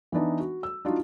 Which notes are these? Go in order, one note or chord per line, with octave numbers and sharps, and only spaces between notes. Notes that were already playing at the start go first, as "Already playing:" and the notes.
E3 B3 D4 D#4
F#4
E6
D4 D#4 F4 F#4